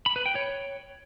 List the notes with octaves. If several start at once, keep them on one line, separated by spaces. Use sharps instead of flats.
B5
B4
G5
C#5